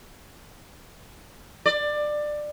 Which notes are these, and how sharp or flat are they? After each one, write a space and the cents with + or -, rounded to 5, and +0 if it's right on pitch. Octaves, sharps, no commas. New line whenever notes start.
D5 +20